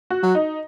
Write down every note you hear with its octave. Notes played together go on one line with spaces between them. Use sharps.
F#4
F#3
D#4